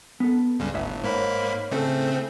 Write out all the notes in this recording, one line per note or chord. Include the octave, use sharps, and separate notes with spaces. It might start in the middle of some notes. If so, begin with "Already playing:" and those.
B3 A4
C#2 G2 C#3
G1 A2 E5 F#5
G#2 A#3 C5 C#5 F#5 B5
A2 C#3 A3 C4 A4